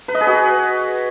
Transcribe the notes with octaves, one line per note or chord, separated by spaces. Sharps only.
B4
D#5
G#4
F#4
B4